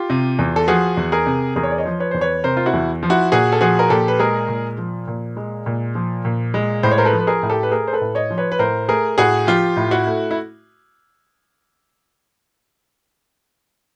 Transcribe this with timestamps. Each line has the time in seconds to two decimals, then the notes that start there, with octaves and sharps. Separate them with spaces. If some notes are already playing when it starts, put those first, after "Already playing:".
Already playing: F4 G4
0.10 C3
0.39 E2
0.56 A4
0.68 F3 F#4 G#4
0.97 E2
1.12 G#4 A#4
1.26 C3
1.56 E2 G#4 A#4
1.63 C#5
1.71 D5
1.78 C#5 D#5
1.85 F3
2.00 B4 C#5
2.11 E2 C5
2.21 B4 C#5
2.44 C3 A#4 C5
2.57 F4
2.66 E4 F#4
2.73 E2
3.03 F3
3.10 E4 F#4
3.32 A#2 F#4 G#4
3.52 A4
3.61 F3 F#4 G#4
3.79 A#4
3.90 A#2 G4 A4
4.08 B4
4.19 G#3 G#4 A#4
4.49 A#2
4.78 F3
5.08 A#2
5.37 G#3
5.66 A#2
5.95 F3
6.25 A#2
6.54 G#3
6.83 A2 C5
6.91 C#5
6.98 A#4 C5
7.05 A4 B4
7.13 F3
7.19 B4
7.27 G#4 A#4
7.43 A2
7.50 G4 A4
7.63 B4
7.71 A3 G#4 A#4
7.87 C5
7.93 A4 B4
8.01 A2
8.15 C#5 D#5
8.31 F3
8.38 B4 C#5
8.52 B4
8.59 A2 A#4 C5
8.89 A3 G#4 A#4
9.18 A2 F#4 G#4
9.47 F3 F4 G4
9.77 A2
9.91 E4 F#4
10.06 A3
10.31 E4